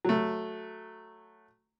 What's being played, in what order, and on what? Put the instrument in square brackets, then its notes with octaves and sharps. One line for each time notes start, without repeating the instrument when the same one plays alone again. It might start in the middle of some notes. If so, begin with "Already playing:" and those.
[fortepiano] F#3 A3